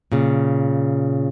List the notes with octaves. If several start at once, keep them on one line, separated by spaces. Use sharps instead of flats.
A#2 C#3